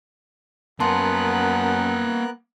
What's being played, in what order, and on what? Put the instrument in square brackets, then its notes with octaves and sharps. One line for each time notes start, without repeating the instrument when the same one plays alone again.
[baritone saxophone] F#2 [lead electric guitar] A#3 F#5 [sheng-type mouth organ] B3 A#4 F#6 [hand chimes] A5 C6